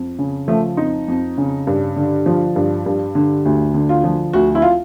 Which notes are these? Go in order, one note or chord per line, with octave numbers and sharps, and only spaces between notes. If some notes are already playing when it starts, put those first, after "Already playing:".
Already playing: F2
C#3
F3 A3
F2 D#4
F2
C#3
G2
D3
F3
G2
G2
D3
D2
D3
F4
F3
D2 F#4
E4
F4